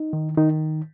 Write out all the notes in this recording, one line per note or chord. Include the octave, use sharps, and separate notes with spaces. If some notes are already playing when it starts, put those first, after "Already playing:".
Already playing: D#4
D#3
D#3 D#4